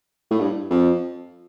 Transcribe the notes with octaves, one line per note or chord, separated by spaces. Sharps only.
A2
G2
F2